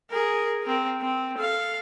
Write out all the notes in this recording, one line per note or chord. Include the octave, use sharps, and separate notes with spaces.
G#4 A#4
C4 A#4
C4
A4 F5